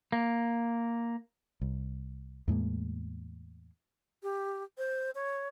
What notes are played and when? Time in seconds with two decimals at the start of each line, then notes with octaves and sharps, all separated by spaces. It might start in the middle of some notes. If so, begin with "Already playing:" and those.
0.12 A#3
1.61 C2
2.48 E2 A2 G#3 A#3
4.23 G4
4.78 C5
5.15 C#5